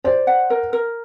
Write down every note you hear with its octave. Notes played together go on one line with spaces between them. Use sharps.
C5 D5
F#5
A#4
A#4